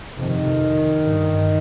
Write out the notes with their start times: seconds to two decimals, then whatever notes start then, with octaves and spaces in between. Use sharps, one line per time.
0.19 F2 C3 D#3
1.03 G2